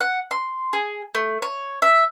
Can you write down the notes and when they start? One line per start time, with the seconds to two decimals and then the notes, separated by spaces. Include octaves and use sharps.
0.01 F#5
0.31 C6
0.73 G#4
1.15 A3
1.42 C#5
1.82 E5